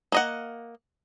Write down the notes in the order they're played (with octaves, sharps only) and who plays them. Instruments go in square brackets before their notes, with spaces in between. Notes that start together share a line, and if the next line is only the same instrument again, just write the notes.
[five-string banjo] A#3 D#5 F#5